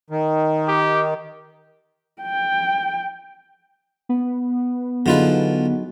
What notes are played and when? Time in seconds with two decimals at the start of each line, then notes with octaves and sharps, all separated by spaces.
0.10 D#3
0.68 G4
2.22 G5
4.09 B3
5.06 D3 F#3 D#4 F4 G#4 B4